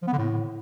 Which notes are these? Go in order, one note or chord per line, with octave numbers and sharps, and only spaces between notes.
F3
B3
D3
A2